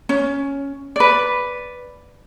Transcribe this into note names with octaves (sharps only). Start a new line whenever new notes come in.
C#4
B4 D5